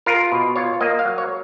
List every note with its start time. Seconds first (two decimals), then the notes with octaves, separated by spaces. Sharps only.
0.06 F4 A#4
0.32 B2
0.56 F4 C#5
0.81 A#3 D#5
0.99 F5
1.05 F#3
1.18 C#5